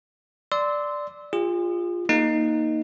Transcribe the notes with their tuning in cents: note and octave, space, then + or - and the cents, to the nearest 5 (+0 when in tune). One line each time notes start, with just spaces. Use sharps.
D5 +0 C6 -15 E6 -20
F4 +0 G#4 -40
A#3 +0 D#4 +0